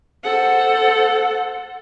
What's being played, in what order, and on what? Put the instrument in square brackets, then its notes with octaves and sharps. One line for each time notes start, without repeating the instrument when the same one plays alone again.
[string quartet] A4 C5 F#5